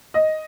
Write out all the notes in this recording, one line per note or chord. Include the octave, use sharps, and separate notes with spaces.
D#5